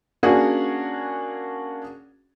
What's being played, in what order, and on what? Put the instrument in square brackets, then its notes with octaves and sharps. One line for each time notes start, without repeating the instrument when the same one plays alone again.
[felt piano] A#3 C#4 D4 F#4 G#4